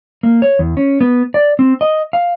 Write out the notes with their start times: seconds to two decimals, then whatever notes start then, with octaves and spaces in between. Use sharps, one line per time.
0.23 A#3
0.42 C#5
0.59 E2
0.77 C#4
1.01 B3
1.34 D5
1.59 C4
1.81 D#5
2.13 F5